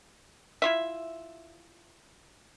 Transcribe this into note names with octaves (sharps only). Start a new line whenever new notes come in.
E4 F4 E5